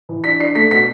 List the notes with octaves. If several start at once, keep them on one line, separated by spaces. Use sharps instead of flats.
E3
D4 B6
D4 C7
A3 B6
B2 B6